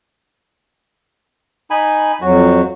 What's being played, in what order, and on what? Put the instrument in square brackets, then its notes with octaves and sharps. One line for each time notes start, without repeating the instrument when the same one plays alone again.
[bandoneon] D#4 G#5 B5
[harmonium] F2 F#3 [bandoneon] F#4